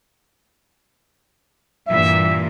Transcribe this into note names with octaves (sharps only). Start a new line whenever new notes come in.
G2 A#2 E3 E5